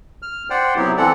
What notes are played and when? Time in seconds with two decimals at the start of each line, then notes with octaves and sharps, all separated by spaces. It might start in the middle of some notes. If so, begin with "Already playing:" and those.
0.22 F6
0.50 C5 D5 F#5 G5
0.76 C3 F#3 B3 E4 G4
0.97 E3 C4 A4 D5 F#5